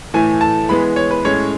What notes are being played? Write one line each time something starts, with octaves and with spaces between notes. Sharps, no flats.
A2 E3 A3 G#5
A5
E3 G#3 B3 B5
C#5
B4
A2 G#3 C#4 C#5